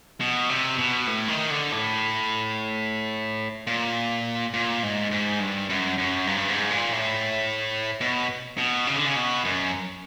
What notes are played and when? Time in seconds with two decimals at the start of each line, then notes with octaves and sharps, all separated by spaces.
0.20 B2
0.49 C3
0.78 B2
1.07 A2
1.28 D#3
1.50 D3
1.72 A2
3.67 A#2
4.54 A#2
4.83 G#2
5.11 G#2
5.40 G2
5.70 F#2
5.98 F#2
6.27 G2
6.48 G#2
6.70 A#2
6.92 A2
8.01 B2
8.58 B2
8.87 C#3
8.96 D3
9.06 C#3
9.16 B2
9.45 F#2